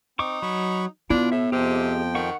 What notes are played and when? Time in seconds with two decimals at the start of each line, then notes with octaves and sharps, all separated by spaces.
0.19 C4 D#4 C#6 D6
0.42 F#3 B5 C#6
1.10 B2 B3 D4 E4 F4
1.32 A2 E5
1.52 F2 C3 F3 G4 G#4 D#5 G5
2.15 D#3 F#5 C#6